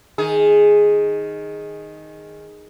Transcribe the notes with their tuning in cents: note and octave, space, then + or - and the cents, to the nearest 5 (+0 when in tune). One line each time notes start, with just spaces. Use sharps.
D#3 +0 G#4 +0